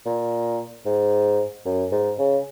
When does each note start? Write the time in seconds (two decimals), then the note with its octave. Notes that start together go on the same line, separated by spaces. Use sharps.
0.06 A#2
0.85 G#2
1.65 F#2
1.92 G#2
2.18 C#3